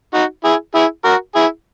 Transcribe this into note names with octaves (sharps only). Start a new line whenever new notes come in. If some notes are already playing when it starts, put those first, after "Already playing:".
D#4 F#4
E4 G#4
E4 G#4
F#4 A#4
E4 G#4